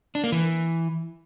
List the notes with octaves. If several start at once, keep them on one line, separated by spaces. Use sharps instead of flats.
D4
A#3
E3